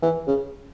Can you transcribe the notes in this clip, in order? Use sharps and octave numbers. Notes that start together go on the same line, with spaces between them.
E3
C#3